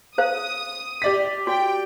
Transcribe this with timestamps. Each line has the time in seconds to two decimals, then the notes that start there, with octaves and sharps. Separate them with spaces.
0.18 G#4 C5 F5 D#6
1.02 G4 D5 B6
1.47 F#4 G5